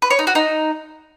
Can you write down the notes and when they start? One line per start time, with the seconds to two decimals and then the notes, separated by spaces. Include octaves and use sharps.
0.02 B4
0.10 C#5
0.19 D#4
0.27 F#4
0.35 D#4